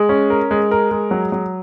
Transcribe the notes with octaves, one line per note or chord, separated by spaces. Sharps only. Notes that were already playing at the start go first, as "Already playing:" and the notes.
Already playing: G#3
C#4
A#4
G#3
A#4
G#3
F#3
F#3